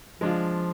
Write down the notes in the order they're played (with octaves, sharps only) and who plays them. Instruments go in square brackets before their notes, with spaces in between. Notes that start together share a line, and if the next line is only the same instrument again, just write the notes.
[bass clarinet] F3 [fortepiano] G#3 D4 F4